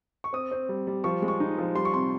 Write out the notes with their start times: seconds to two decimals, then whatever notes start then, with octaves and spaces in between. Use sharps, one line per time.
0.24 C#6
0.33 C4 D#6
0.51 C4
0.69 G3
0.87 G3
1.04 F3 C#6
1.22 G#3
1.28 C#6
1.40 D#4
1.58 F3
1.75 G3 C6
1.85 C#6
1.93 C3 C6